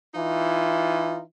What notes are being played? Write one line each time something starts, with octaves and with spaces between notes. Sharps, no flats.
E3 D#4 F4